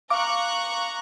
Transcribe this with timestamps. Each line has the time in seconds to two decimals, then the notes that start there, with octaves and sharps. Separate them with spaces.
0.10 F5 A#5 C#6 D6 F#6